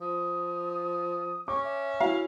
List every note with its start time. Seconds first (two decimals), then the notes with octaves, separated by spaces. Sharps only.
0.01 F3 D#6
1.48 C#4 C#6 D6
1.64 E5
2.00 E4 F#4 F5